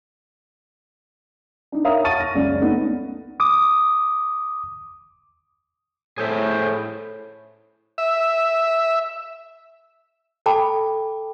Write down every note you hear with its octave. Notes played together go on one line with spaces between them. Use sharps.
D4 D#4
A#4 C#5 E5 F5 A#5 D#6
F#5 A5 C#6 A6 D#7
F6 A#6
C#2 F#2 C#4 D5
A3 B3 D4 D#4
D6 D#6
A2 G#4 C5 E5
E5
A4 G5 A5 B5 D6